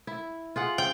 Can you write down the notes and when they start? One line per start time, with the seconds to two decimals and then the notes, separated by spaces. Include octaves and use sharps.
0.07 E4
0.56 F4 G#4 F#5
0.78 G5